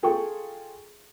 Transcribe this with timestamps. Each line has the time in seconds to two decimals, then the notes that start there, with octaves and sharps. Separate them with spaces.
0.03 F4 G#4 A4 G5 C#6